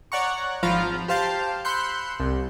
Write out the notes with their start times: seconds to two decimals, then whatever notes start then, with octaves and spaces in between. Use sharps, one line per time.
0.12 C#5 D5 F#5 A#5 C#6
0.63 G#1 F3 F4 F5 A#5 B5
1.08 G4 C5 F5 A5 G6
1.65 B5 C6 E6 F#6 G6 C#7
2.20 C2